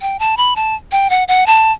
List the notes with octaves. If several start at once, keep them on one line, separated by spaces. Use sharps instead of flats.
G5
A5
B5
A5
G5
F#5
F#5
A5